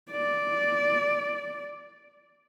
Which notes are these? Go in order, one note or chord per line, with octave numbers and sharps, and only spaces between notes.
D5